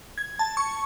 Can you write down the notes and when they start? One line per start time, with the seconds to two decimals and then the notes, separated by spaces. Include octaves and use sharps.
0.18 G#6
0.39 A5
0.57 C#6